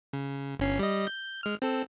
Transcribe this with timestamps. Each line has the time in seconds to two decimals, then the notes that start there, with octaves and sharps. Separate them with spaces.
0.13 C#3
0.60 G1 C#4 C7
0.79 G3 D#5
1.07 G6
1.43 G#3 F6
1.62 C4 A4